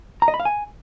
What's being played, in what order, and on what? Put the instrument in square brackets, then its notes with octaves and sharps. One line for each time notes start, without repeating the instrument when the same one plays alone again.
[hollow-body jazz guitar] A#5
D#5
B5
F5
G#5